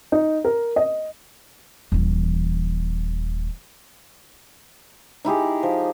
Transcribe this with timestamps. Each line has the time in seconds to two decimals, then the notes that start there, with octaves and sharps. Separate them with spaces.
0.12 D#4
0.45 A#4
0.76 D#5
1.92 D#1 E3
5.25 D#4 E4 G4 G#4
5.63 F3